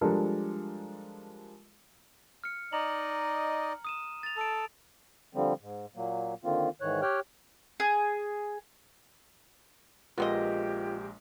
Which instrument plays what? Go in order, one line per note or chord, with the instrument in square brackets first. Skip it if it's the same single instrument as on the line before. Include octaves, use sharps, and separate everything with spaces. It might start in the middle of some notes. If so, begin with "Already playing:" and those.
[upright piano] F3 G3 G#3 D4 A4 A#4
[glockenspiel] F6 C#7
[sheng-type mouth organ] D#4 D5 D#5 [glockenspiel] A#5 F#7
[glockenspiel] D#6 D#7 E7
A6 F7
[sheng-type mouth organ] A4 [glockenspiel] D7 F7
[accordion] D3 F3 G3 C4
G#2
A#2 F#3 A#3
D3 D#3 A#3 C4 F4
G#2 D#3 E3 C#5 F#6
G4 C#5 G5 F6 F#6
[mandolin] G#4
[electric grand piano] A#1 G#3 A#4 [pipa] B3 C4 D#5 [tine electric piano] F4 [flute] G4